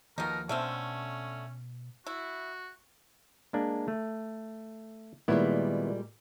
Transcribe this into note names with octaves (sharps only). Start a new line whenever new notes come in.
D#2 B2 F3 A#3 D#4 A#4
B2 D3 A3 C4 C#4 F5
E4 F#4
G#3 A#3 D4
A3
A#2 D#3 G3 G#3 B3 E4